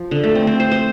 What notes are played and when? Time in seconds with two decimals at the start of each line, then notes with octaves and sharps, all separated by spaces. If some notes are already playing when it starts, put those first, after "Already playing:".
Already playing: F3
0.11 D3
0.24 A3
0.35 C4
0.47 C4
0.60 C5
0.71 C5